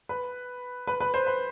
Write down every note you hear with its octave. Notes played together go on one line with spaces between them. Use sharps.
B4
B4
B4
C5
B4